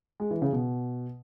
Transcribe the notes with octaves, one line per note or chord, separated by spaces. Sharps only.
G#3
E3
C#3
B2